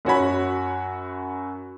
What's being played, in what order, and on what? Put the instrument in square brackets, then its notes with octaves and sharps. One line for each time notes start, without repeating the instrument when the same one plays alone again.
[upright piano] F#2 F#4 C#5 B5